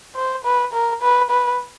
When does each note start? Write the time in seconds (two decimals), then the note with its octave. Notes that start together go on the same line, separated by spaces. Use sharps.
0.16 C5
0.44 B4
0.73 A#4
1.02 B4
1.30 B4